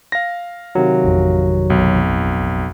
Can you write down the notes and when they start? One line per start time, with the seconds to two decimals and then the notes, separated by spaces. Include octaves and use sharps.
0.12 F5 A#6
0.75 C3 D#3 F#3
1.04 A1 F2
1.70 B1